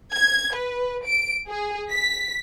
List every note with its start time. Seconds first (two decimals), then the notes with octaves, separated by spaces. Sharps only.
0.15 G#6
0.57 B4
1.06 D7
1.49 G#4
1.89 B6